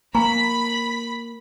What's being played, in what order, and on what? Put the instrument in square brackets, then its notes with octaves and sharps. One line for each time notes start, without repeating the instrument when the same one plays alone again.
[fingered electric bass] A#3 [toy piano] G#5 A#5 C#6 [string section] B5